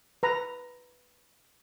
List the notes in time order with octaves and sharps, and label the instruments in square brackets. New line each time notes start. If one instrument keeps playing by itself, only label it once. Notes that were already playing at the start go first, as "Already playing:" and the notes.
[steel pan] B4 A#5